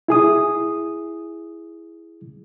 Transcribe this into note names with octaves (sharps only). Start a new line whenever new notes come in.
E4 G#4 D#6